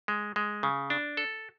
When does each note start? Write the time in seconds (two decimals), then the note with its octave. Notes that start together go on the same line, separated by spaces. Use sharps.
0.08 G#3
0.36 G#3
0.63 C#3
0.90 D4
1.17 A4